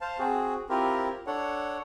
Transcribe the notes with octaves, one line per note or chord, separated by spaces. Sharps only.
C5 F5 A5
C4 F#4 G#4
C4 E4 F4 G4 A#4
D4 A4 C#5 F#5